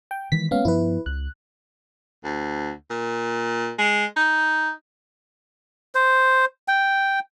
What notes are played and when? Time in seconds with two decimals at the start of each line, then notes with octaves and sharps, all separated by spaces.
0.11 G5
0.32 D#3 E3 G#3 B6
0.51 G2 G#3 A#3 B3 C#4 F5
0.65 G2 F3 B3 E4 B4
1.06 C#2 F#6
2.24 D2
2.90 A#2
3.79 G#3
4.16 D#4
5.95 C5
6.68 G5